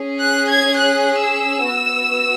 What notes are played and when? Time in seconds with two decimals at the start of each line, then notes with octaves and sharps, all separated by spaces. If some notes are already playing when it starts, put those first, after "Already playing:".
Already playing: C#4 G#4
0.20 F#6
0.49 G#6
0.78 F#6
1.24 E6
1.68 B3 F#4